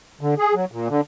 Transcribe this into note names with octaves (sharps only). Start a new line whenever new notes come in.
D3
G#4
F#3
A#2
D3